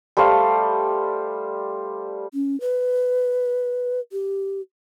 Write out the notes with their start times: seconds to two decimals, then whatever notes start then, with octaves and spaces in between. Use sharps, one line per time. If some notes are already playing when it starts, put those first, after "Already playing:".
0.17 G3 A3 C5 F5
2.34 C#4
2.61 B4
4.12 G4